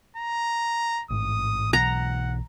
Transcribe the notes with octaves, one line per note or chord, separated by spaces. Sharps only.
A#5
A1 G#2 D#6
B1 B2 E3 F#5 A#5